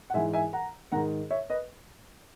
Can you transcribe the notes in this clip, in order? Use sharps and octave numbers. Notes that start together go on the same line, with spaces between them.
F#5
G#2 E3 E5 G#5
E5 G#5
F#5 A#5
G#2 D#3 F#5 A#5
C#5 E5
B4 D#5